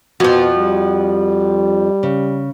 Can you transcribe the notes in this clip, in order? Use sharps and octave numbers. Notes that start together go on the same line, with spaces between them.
F2 B2 F3 F#4
G3
C#3